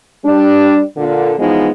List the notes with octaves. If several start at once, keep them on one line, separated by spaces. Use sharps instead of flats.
G3 D4
A#2 D3
E3 F3 G#3 B3 D#4